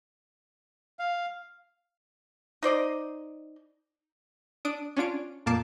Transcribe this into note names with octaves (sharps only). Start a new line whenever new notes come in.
F5
D#4 C5 D5 D#5
D4 D#6 D7
C#4 D4 F4 D7
F2 A#2 A#3 A5 D6 C7